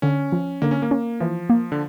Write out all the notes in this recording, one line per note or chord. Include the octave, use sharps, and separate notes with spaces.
D3 C#4
F3
D3 A#3
C#4
A#3
C#4
E3 F3
A#3
D3